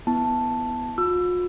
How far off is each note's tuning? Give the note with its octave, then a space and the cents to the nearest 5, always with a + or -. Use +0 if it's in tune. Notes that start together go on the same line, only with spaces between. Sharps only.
B3 +0 E4 +0 A5 +0
F4 +45 E6 +25